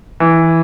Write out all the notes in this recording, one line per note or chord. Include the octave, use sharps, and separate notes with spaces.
E3